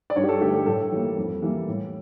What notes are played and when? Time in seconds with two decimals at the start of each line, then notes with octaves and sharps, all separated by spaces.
0.10 D5
0.16 G2 C#5
0.24 G4
0.29 A4
0.41 D3 A3 G4
0.54 A4
0.66 A2 A4
0.92 E3 G3 A#3
1.17 F2
1.42 E3 G3 A#3
1.67 A2